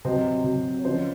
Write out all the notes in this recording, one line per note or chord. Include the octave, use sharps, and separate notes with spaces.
C3 F#3 C5 D#5
C3 F#3
C#5
C#3 F3 C5 D#5